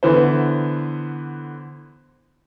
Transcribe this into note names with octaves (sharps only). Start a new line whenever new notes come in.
D3 E3 B3 C5